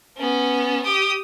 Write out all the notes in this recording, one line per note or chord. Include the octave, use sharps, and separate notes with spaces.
B3 C#4
G4 D#6